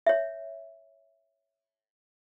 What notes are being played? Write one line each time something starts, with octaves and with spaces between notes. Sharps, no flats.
C#5 E5